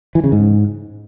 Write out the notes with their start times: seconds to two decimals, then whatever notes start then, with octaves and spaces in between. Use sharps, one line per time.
0.15 E3
0.24 C#3
0.32 G#2